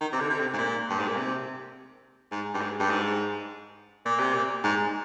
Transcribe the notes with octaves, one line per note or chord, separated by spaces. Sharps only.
D#3
C3
D3
D3
C3
G#2
A#2
G2
G#2
A#2
C3
G#2
G2
G#2
G2
G#2
A#2
C3
A#2
G#2